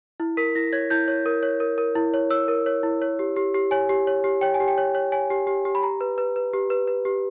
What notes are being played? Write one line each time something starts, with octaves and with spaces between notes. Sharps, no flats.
E4
A#4 B6
E4 A#6
C#5 G#6
E4 G6
C#5
A#4
C#5
A#4
A#4
E4
C#5
C#5 E6
A#4
C#5
E4
C#5
G4
G4
G4
C#5 G#5
G4
C#5
G4
C#5 G5
G#5
G4
G5
C#5
C#5
C#5 G#5
G4
G4
G4
B5
G4 A#5
B4
B4
B4
G4
B4
B4
G4